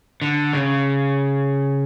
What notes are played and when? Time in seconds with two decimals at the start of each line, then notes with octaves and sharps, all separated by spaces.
0.22 D3
0.53 C#3